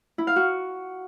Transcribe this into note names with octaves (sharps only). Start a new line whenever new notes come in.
E4
F5
F#4